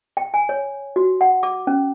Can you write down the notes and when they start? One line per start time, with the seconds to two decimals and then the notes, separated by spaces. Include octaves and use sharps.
0.17 G5
0.34 G#5
0.49 C#5
0.96 F#4
1.21 F#5
1.43 D6
1.67 C#4